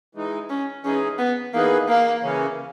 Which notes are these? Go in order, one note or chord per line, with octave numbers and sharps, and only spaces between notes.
E3 G#3 D#4
C#4
E3 G#3 C#4 D#4 G#4
B3
E3 A#3 B3 D#4 G#4 B4
A#3
C#3 E3 A#3 C#4